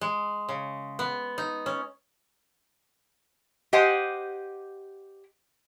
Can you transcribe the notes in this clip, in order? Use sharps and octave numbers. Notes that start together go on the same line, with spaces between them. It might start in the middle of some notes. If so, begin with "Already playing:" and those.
G#3
C#3
B3
D#4
C#4
G4 C5 D#5 F#5 G#5